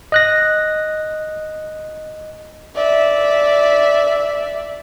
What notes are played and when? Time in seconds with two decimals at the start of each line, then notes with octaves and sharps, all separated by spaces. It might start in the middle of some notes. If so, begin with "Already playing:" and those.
0.12 D#5 F#6 A#6
2.76 D5 E5